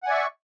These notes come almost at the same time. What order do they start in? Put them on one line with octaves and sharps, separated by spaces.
F#5 G#5 D5 E5 C#6